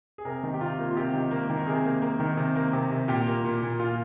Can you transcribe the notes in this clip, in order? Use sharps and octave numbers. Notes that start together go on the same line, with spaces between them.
G#4
C3 A#4
D#3
G4
C3 F4
A#3
F4
C3 G4
D#3
A#3
D#3
A#4
C3 G#4
A#3
A#3
D#3
C3
A#3
C3
C3
A#2 G4
A#3
A#2
A#2
A#2 F4